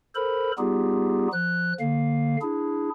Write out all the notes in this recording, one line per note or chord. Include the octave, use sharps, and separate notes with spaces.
A4 A#4 C5 B5
G3 B3 D#4 F4 G4 G#4
F3 F#6
D3 A#3 F5
D4 E4 G#4